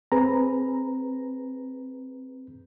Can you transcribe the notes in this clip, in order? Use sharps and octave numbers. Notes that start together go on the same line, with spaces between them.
C4 G#4 B4 A#5